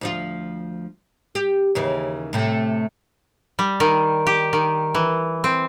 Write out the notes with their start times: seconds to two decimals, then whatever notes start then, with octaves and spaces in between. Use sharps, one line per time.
0.01 D2 F3 F4
1.35 G4
1.75 D#2 C#3 E3
2.33 A2 C3 A3
3.59 G3
3.80 D#3
4.27 G4
4.53 D#3
4.95 E3
5.44 C4